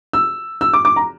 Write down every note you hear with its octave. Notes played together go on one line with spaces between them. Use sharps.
E6
E6
D6
D6
A#5